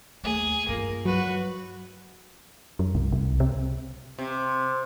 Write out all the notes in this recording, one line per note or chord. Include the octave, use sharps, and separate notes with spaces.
D#2 A3 G#4
G2 A#3 F4
F#3 F#4 B4
F#2
C2
C2
C3
C3